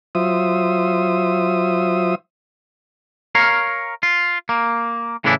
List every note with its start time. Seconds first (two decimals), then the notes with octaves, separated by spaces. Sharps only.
0.15 F#3 F4 C5 E5 D#6
3.35 A#4 C#5 F5
4.03 F4
4.49 A#3
5.24 A2 C#3 E3 D4 E4